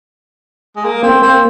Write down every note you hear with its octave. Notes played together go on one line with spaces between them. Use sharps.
G#3
A#3
A#3 C4
A#3 C4